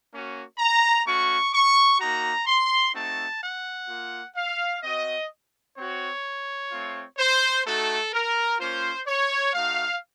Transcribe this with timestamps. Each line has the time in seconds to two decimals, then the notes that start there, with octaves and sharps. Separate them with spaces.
0.12 A#3 C#4 F#4
0.58 A#5
1.05 A3 C#4 F#4 C#6
1.54 C#6
2.00 A#3 D#4 F#4 A#5
2.47 C6
2.94 A3 C4 D#4 F#4 A5
3.41 F#5
3.89 A#3 F4
4.36 F5
4.83 C4 F#4 D#5
5.77 C4 F#4 C#5
6.71 A3 C4 F4
7.19 C5
7.65 A3 D#4 F#4 A4
8.13 A#4
8.59 A#3 C#4 F4 C5
9.07 C#5
9.54 A3 D#4 F#4 F5